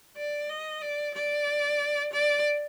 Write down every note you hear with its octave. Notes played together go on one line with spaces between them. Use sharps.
D5
D#5
D5
D5
D5